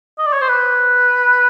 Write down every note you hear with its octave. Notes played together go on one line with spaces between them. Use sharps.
D#5
D5
C#5
C5
B4